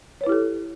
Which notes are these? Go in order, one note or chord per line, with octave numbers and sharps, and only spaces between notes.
E4 G4 A4 B4 C#5